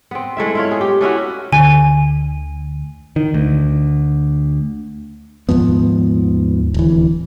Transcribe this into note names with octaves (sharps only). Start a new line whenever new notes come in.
B3 C4
G#3 A3 E4 E5
E4 F4 C#5
F4 G#4
G4
A3 C#4 E4 F#4
D2 D3 G#5
D#3
D2
D#2 G#2 F3 B3
D1 E3